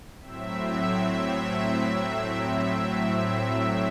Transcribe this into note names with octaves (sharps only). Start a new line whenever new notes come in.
A2 F#3 C4 E5